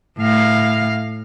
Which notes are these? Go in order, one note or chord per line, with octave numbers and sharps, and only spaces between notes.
A2 F5